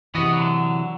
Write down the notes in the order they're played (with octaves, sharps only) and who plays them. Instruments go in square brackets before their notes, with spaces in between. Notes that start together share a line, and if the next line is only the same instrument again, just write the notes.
[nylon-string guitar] C3 E3 [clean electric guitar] B3 F#4 D#5
[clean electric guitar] D3 F#3